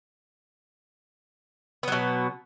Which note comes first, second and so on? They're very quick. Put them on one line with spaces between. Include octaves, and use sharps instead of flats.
B3 F#3 B2